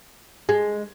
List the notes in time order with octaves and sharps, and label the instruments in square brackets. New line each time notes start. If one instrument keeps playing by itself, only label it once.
[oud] G#3